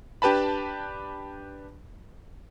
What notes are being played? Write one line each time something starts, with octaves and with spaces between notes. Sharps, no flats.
D4 G4 B4 A5 B5